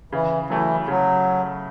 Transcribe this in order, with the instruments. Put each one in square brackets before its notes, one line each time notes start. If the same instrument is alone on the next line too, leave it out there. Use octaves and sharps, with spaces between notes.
[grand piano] C#3 [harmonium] E3
[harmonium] E3 [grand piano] F#3 A3 E4
[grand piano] C#3 [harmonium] F#3